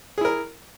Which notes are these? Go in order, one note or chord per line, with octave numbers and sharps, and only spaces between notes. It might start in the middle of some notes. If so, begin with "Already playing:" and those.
E4 G#4 A#4